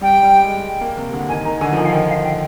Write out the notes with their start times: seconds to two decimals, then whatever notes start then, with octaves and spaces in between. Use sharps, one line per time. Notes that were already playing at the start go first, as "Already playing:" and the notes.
0.01 G3 G5
0.23 G3
0.44 G#3
0.81 A#3
0.97 C3
1.13 D3
1.29 D#3 G#5
1.45 D#3 A#5
1.60 D3 G#5
1.73 F3
1.77 D#3 G#5
1.85 F5
1.93 D#3 G5
2.09 F5
2.24 G5